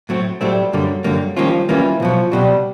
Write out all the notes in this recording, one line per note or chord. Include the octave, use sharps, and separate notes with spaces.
A2 F#3 A3 C4
A2 F#3 G3 A3 C4
F#2 D3 F#3 G3 A#3
F#2 D3 G3 A#3
D#3 F3 G3 A#3 C#4 F4
D#3 E3 G3 A#3 C#4 F4
C2 B2 F3 F#3
C2 B2 F#3 G3